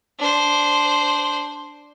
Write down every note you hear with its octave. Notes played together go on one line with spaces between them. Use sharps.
D4 C5